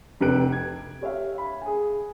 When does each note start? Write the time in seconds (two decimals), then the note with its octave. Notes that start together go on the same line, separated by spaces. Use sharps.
0.21 F1 C3 A4 B4 F#6 D7
0.52 G#6
1.02 G4 C#5 E5 F5
1.38 B5
1.61 G#4 G#5